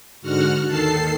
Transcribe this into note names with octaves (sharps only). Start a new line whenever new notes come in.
G#2 D3 F#4 F#5 F6
D#2 D#3 A4 A5 C7